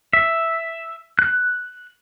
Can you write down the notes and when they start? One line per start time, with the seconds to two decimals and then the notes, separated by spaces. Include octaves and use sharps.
0.13 E5
1.19 F#6